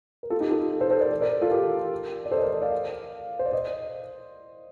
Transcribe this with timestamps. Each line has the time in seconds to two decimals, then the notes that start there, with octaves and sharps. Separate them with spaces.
0.23 A#4
0.30 F4 A4
0.40 D#4 G4
0.51 F4 A4
0.80 A4 C5
0.91 A4 C5
1.01 A#4 D5
1.21 A#4 D5
1.42 F4 A4
1.51 G4 A#4
2.25 D5
2.31 A4 C5
2.37 D#5
2.42 A#4 D5
2.62 D5 F5
3.39 C5
3.46 D5
3.52 C5 D#5